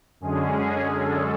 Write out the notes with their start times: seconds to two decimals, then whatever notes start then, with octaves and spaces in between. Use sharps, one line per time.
0.20 F#2 D3 G#3 C#4 G#4
0.94 A4